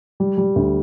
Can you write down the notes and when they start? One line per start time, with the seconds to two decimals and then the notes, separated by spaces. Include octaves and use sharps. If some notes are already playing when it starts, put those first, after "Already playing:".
0.20 G3
0.38 G3
0.56 D2